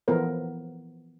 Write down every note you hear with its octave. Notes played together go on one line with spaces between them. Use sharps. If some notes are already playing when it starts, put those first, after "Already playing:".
E3 F3 B3 A4 A#4 C5